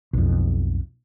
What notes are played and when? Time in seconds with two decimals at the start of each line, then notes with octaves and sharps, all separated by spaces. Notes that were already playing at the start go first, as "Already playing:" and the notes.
0.13 B1 F2